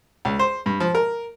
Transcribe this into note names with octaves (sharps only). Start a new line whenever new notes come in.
C#2
C5
G2
F3
A#4